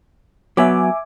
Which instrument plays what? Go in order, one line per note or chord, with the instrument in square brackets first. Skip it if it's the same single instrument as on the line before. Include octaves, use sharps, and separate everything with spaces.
[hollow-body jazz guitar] F#3 B3 [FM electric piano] E5 G#5 D6